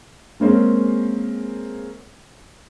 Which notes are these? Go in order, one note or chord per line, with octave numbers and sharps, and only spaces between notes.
G#3 A#3 C4 C#4 G#4